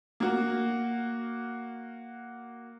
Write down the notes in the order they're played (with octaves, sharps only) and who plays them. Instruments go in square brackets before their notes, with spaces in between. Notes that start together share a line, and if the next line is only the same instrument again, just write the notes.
[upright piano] A#3 F#4